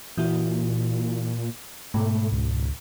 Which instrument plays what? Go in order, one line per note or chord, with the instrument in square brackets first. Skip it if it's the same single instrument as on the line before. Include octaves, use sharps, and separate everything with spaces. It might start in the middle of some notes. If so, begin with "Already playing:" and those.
[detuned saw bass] A#2 [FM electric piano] E3 E4 F#4
[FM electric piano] G#2 B2 [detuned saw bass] A3
[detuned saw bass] C#2